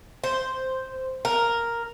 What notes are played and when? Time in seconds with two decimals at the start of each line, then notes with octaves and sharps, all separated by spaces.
0.23 C5
1.25 A#4